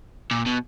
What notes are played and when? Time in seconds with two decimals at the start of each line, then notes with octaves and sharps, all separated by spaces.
0.31 A#2
0.46 B2